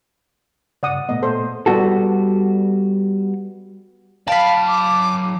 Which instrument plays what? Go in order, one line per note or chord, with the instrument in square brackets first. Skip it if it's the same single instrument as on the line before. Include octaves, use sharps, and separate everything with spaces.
[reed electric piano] G2 C#3 [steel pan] D5 F#5 D#6
[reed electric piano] A#2 A3 B3 [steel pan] D#5
[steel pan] A4 C5
[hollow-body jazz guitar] G3 B3 F#4 A4
[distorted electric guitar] F#3 G5 [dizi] F5 [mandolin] A5 B5
[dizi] D6